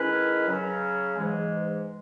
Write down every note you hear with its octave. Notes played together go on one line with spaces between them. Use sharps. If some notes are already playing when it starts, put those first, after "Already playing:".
Already playing: D#3 G#3 C#4 E4 B4
C#3 F#3 C#4
G#2 E3 G#3